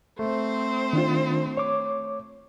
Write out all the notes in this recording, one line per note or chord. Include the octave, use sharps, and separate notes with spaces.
A3 C4 C5
D#3 D4 F4
C#5 D6